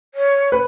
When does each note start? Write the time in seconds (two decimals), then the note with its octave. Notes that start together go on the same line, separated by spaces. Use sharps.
0.14 C#5
0.52 B4